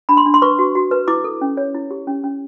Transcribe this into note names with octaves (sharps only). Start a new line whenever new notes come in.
D4 B5
C6
D4
C6
B4 C#6
F#4
F#4
B4
E4 D6
A4
C#4
C#5
E4
G4
C#4
C#4